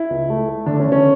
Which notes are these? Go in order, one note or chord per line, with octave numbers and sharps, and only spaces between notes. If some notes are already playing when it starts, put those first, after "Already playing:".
Already playing: E4
C#2
A3
A3
D3 D4
C#4
D3
C#4